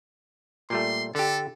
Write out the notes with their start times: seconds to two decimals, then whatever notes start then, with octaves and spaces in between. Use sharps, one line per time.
0.70 A#2 G3 A3 C6
1.15 D3 G4 A4